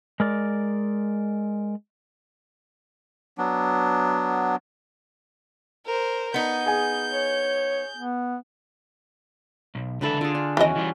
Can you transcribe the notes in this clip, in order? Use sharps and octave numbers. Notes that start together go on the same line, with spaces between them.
G#3 A#4 D5
F#3 B3 D4
A#4 C5
B3 D#4 G6
G#4 G#5
C#5
B3
B1
C#2 D3 D4 A4 B4 E5
D3 F4 G#4
D4
D#2 E3 C#4 E4 F#4 D#5
E3 G3 F4